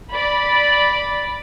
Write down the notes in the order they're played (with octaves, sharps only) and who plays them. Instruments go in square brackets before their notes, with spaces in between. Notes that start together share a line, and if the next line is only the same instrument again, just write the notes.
[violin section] D5 B5